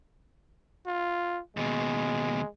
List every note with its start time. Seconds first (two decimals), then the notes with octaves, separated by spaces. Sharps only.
0.87 F4
1.57 D#2 B2 G#3